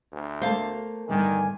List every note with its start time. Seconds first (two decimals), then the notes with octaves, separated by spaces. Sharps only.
0.12 D2
0.41 A3 A#3 C5 F5 A5
1.09 E2 G2 D3 D#3 G#5